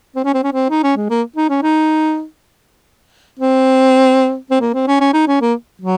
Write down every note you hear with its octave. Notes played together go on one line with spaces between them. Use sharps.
C4
C#4
C4
C#4
C4
D#4
C#4
G#3
A#3
D#4
C#4
D#4
C4
C4
A#3
C4
C#4
C#4
D#4
C#4
A#3
F#3